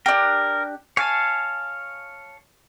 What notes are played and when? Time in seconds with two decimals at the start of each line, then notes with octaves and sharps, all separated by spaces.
0.06 D4 G4 A#4
0.97 C#5 F5 G#5 A5